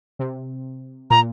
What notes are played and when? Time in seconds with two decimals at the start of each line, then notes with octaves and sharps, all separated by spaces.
0.19 C3
1.10 A#2 A#5